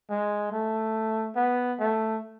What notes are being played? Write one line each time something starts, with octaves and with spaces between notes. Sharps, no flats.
G#3
A3
B3
A3